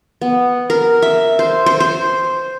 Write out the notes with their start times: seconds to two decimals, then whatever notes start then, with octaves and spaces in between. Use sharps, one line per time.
0.22 B3
0.70 A#4
1.02 E5
1.39 C5
1.66 C5
1.80 C5